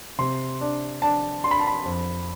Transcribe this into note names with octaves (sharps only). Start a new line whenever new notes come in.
C3 C6
D4
D4 A5
D4 C6
B5
A5
B5
F2